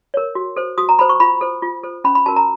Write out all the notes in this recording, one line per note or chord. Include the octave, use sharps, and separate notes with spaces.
A#4 C#5
F#4
A4 C5
F#4 D#6
A#5
A4 C5 B5
C#6
F4 B5
A4 C5
F4
A4 C5
C#4 B5
B5
F#4 A#4 A5
A#5